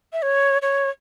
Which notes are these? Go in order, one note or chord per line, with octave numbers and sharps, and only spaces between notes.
E5
C#5
C#5